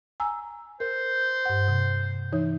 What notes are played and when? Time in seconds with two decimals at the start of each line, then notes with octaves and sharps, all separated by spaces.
0.20 G#5 A#5 E6
0.80 A#4 C5
1.45 G2 F#5
1.68 C3
2.33 E3 D#4 C#5